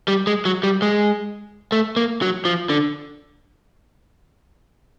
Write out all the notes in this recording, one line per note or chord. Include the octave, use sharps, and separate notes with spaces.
G3
G#3
F#3
G3
G#3
A3
A#3
F#3
F3
D3